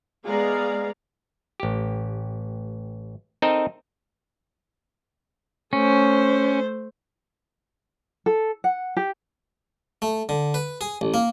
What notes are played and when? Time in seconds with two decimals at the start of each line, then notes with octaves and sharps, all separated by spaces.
0.25 G#3 B3 G#4 D5 F5 A#5
1.60 A1 G4
3.42 C4 D#4 A4 A#4 D#5
5.73 A3 C#4 C5
8.26 A4
8.64 F#5
8.97 G4
10.02 A3
10.29 D3
10.54 B4
10.81 G#4
11.01 A1
11.14 A#3